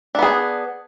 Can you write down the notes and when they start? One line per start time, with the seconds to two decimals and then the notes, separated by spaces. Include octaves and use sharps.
0.15 D4
0.19 B3
0.23 G#4